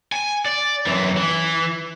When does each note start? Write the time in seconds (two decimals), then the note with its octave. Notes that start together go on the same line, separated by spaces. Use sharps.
0.12 G#5
0.46 D5
0.86 F#2 E3
1.17 E3